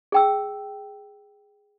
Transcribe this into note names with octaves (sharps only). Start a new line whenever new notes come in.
G#4 G5 E6